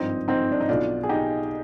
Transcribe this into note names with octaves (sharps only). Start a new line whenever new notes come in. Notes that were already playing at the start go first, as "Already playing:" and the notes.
Already playing: G#1 G2 F3 C4 D#4
C4 D#4
D4
D#4
B1 B2 D4 F4
G#4
D#4 G4